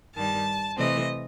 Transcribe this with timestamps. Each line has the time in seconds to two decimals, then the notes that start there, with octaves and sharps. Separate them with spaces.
0.15 G2 D#3 G3 A5
0.76 C3 E3 A3 C4 D#5